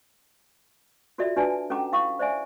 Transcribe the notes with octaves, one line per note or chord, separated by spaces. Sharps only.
F4 F#4 A4 D5 E5
D4 F#4 B4 D5 G#5 A5
C#4 A4 F#5 G5 A#5 D6
E4 F5 C#6 D#6
C5 D5 E5 G#5